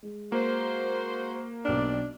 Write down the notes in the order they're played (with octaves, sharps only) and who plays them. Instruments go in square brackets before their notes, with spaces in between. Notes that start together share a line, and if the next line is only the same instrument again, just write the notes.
[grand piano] G#3
[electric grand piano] A#3 [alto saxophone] F#4 [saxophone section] C5
[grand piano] B1 F6 [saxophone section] C4 G4 D5 [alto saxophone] D4